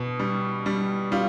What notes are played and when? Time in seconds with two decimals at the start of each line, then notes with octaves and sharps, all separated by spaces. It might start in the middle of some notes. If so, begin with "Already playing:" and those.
Already playing: B2
0.19 G3
0.66 G3
1.12 G3 F4